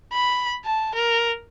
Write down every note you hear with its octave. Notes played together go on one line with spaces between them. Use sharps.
B5
A5
A#4